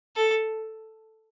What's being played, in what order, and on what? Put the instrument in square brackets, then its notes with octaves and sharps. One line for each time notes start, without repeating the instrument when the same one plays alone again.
[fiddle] A4